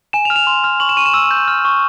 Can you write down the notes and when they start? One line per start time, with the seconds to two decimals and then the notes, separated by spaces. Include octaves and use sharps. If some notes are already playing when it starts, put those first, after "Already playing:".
0.13 G#5 E7
0.25 F7
0.30 F6
0.36 F7
0.47 C6
0.64 F6
0.80 C#6 F#7
0.89 E7
0.97 C#6 D#7
1.06 E7
1.14 E6
1.31 G6
1.48 F6
1.65 C#6